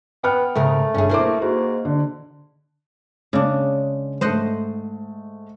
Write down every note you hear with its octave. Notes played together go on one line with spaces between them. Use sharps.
B3 G5 F6
G#2 C#3 A3 A#4
G1 C#4 G#4
A#3 E4 A#4 C5 D6
G#2 F#4
D3
C#3 G#3 D4
G#2 A3 C5 D#5 F#5